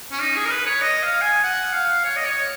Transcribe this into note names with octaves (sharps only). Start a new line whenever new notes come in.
C#4
D#4
G#4
A#4
B4
C#5
D#5
F5
G#5
F#5
F5
C#5
D#5
C#5